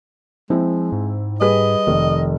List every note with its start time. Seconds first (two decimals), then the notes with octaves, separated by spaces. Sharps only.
0.50 F3 G#3 C4 E4
0.92 G#2
1.41 G3 G#4 B4 D#5
1.87 F1 D#3